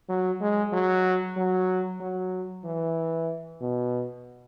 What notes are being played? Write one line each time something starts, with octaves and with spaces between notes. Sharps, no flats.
F#3
G#3
F#3
F#3
F#3
E3
B2